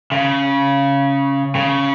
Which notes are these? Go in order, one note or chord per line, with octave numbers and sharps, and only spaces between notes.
C#3
C#3